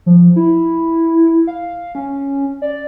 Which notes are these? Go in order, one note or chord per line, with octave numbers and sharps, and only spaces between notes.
F3
E4
F5
C#4
D5